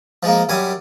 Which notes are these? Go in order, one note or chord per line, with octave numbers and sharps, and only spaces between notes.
F3 G#3 A#3
F#2 G3 G#5